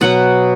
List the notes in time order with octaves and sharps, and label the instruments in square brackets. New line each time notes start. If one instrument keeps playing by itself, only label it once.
[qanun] B2 F#3 B3 F#5